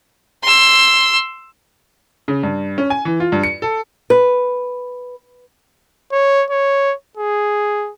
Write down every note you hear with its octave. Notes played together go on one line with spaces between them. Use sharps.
C6 E6
C#3
G2
C#4
G#5
E3
F4
G2
C#7
A4
B4
C#5
C#5
G#4